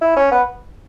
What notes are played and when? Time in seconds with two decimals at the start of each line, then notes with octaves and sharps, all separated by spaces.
0.01 E4
0.16 C#4
0.31 B3